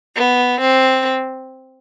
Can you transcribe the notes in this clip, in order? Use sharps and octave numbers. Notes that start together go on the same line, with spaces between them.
B3
C4